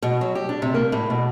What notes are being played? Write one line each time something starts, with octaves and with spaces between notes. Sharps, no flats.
B2
F#3
G4
D4
C3
A#3
A2
B2